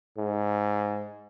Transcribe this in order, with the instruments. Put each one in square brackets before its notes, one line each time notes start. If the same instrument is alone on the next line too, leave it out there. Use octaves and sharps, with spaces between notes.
[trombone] G#2